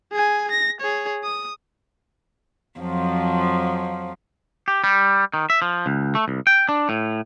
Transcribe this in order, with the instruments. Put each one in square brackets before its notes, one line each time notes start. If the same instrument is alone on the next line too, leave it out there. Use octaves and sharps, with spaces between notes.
[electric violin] G#4 G#5
A#6
G#4 C#5
D#6
[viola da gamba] F2 F3 F#3
[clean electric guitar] G4
G3
D#3
E5
F3
C#2
A3
C2
G5
D4
A2